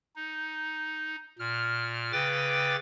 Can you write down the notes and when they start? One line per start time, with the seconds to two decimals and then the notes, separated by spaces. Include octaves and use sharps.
0.16 D#4
1.39 A#2 F6
2.12 C#3 B4 G5 D6 A6